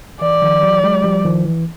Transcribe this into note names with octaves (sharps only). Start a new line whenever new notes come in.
E3 D5
D#3 F3
E3 F#3
F#3 G#3
F3 G3
D#3 F3
E3